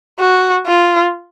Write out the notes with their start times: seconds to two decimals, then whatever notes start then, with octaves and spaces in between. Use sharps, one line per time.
0.19 F#4
0.66 F4